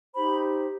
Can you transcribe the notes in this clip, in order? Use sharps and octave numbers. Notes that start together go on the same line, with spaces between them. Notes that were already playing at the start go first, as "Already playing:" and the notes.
D#4 G4 C5 B5